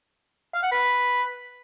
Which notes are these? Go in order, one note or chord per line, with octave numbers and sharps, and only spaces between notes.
F5
F#5
B4